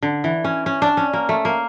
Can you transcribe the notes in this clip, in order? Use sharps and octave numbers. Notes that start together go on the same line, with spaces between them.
D3
E3
C#4
C#4
D4
C#4
A#3
A3
A#3